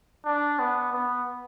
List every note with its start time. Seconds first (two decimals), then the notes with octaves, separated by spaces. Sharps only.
0.25 D4
0.59 B3
0.93 B3